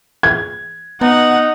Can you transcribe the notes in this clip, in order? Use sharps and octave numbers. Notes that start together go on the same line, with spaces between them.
G#6
B3 D#4 F#5